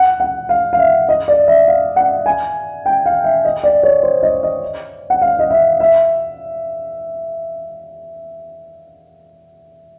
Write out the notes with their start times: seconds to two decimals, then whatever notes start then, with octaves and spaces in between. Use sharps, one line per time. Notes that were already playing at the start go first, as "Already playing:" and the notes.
Already playing: F#5
0.20 F#5
0.49 F5
0.73 F5
0.79 E5
1.09 D#5
1.28 D5
1.48 E5
1.68 F5
1.96 F#5
2.26 G#5
2.86 G5
3.06 F5
3.24 E5
3.45 D#5
3.64 D5
3.83 C#5
4.03 C5
4.23 D#5
4.43 D#5
5.10 F#5
5.22 F5
5.39 D#5
5.50 E5
5.80 E5